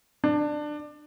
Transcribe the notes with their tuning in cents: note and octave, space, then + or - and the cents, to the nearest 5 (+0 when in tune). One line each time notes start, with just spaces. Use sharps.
D4 +20